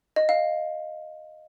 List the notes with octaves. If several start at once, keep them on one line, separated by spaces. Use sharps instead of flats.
D#5
F5